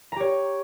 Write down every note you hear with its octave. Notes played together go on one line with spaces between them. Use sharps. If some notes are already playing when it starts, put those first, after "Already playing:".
G4 C#5 A#5